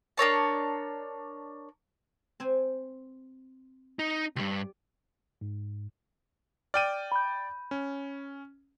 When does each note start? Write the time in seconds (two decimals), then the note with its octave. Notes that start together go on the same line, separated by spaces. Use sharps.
0.17 D4 A#4 C#5 A5
2.40 C4 C5 G#5
3.99 D#4
4.36 C#2 G2 G4 D5
5.41 G#2
6.74 D5 G5 F6 D#7
7.12 B5 G6
7.71 C#4